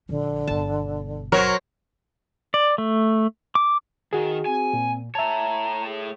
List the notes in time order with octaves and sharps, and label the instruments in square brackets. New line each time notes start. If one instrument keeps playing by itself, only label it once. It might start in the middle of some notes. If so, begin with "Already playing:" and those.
[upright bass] A#1 F3 [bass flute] D3
[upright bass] G1 B2 [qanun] A5
[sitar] F#3 A#4 [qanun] C5 C#5
[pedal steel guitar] D5
A3
D6
[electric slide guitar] D#3 [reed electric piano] F#4 G#4
[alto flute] C4 [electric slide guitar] G#5
[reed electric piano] A#2
[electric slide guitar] A3 C#5 [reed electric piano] E5 A5 [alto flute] A#5
[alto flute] G#4